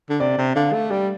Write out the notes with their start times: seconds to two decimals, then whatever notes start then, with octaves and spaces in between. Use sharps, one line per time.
0.09 D3
0.20 C3 D5
0.38 C3
0.56 D3 F5
0.73 A3
0.91 G3 D5